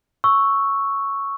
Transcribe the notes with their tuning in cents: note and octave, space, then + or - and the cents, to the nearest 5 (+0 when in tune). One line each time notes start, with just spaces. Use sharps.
C#6 +0 E6 -5